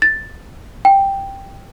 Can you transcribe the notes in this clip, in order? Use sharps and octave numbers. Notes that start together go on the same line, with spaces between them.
A6
G5